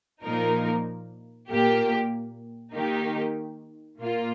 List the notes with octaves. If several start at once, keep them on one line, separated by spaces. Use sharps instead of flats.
A#2 F3 A#3 D#4 A#4
A#2 A#3 G4
D#3 A#3 D#4 G4
A#2 A#3 F4